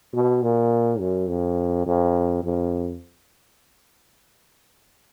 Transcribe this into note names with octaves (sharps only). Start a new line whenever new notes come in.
B2
A#2
F#2
F2
F2
F2